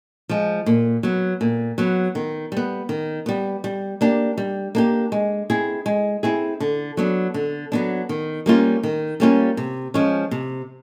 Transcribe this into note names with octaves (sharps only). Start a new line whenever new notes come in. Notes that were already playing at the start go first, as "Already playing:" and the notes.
F3 G#3
A#2
F#3 B3
A#2
F#3 B3
D#3
G3 B3
D#3
G3 B3
G3
A#3 D4 G4
G3
A#3 D4 G4
G#3
C4 E4 G#4
G#3
C4 E4 G#4
D3
F#3 B3 D4
D3
F#3 B3 D4
D#3
G3 A#3 C#4 F4
D#3
G3 A#3 C#4 F4
C3
F3 G#3 C#4
C3